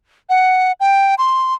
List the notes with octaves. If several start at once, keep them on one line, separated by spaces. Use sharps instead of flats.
F#5
G5
C6